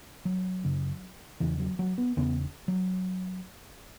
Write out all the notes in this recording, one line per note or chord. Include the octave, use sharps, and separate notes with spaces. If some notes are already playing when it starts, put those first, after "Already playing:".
F#3
F#2 C#3
E2 C#3 E3
F#3
F#3
B3
E2 C#3 B3
F#3